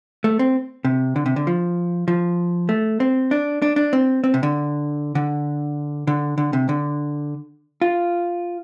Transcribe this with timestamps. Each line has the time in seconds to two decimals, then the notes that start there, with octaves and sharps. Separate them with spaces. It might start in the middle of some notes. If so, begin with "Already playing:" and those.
0.24 A3
0.39 C4
0.85 C3
1.16 D3
1.26 C3
1.36 D3
1.47 F3
2.08 F3
2.69 A3
3.00 C4
3.31 D4
3.62 D4
3.76 D4
3.93 C4
4.24 C4
4.34 C3
4.43 D3
5.15 D3
6.07 D3
6.38 D3
6.53 C3
6.69 D3
7.82 F4